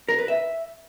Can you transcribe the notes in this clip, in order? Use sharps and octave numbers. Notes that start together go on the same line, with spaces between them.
A#4
B4
E5